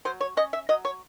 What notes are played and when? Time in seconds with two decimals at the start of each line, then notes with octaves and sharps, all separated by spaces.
0.05 F#3 C5
0.21 C#5
0.37 C#4 D#5
0.53 E5
0.69 F#3 D#5
0.85 C#5